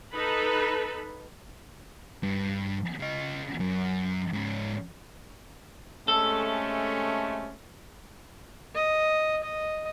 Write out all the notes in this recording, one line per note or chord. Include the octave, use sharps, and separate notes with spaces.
D#4 A4 B4 B5
G2
C#3 D#5
F#2
G#2 C#4
C3 G#3 A3 C#4 A4
D#5
D#5